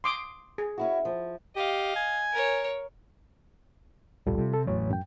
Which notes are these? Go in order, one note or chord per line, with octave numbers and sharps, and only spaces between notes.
C6 D6 D#6
G#4
C#4 E4 F#4
F3
G4 D#5 F5
G#5
A#4 C#5
D1 A#1 G3 F4 A4
C3
A4
E2 A2 E3 F#3 A3 C#5
F#2 G5